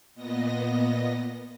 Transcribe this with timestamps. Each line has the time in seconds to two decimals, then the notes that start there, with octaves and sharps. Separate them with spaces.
0.15 A#2 B3 D#5 A#6